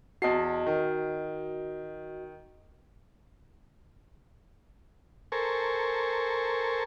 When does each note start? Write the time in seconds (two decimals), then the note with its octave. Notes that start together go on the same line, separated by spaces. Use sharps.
0.22 E2 F#4 D#5 A5 C7
0.66 D#3
5.32 A4 A#4 C5 G#5 C#6